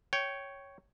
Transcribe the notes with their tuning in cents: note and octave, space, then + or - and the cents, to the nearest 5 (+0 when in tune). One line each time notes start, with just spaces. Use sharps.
C#5 +0 G5 -15